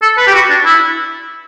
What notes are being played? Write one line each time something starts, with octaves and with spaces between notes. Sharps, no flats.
A4
B4
G4
F#4
D4
E4